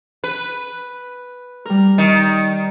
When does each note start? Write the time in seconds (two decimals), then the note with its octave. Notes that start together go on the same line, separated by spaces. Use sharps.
0.24 B4
1.65 G3 A#4
1.98 D#3